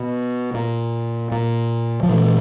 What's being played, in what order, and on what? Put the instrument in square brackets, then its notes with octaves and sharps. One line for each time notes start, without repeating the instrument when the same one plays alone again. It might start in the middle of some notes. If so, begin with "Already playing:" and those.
Already playing: [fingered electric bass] B2
A#2
A#2
F3
A#2 E3